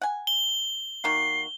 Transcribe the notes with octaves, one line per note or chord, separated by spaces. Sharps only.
F#5 G#5
G7
D#3 A#3 F#4 C7